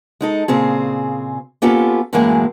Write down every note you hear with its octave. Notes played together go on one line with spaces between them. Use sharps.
G#3 D#4 A4
A#2 C#3 C4 G#4
A#3 B3 C#4 F4 G4 A4
F#2 A2 E3 F#3 G#3 A#3